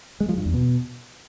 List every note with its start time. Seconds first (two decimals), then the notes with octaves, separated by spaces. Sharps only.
0.20 G#3
0.29 F3
0.37 G2
0.46 E2
0.54 B2